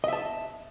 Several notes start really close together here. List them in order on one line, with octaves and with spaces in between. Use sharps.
D#5 E5 A5